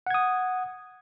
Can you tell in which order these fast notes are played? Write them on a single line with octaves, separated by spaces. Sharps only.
F#5 G#6 D#6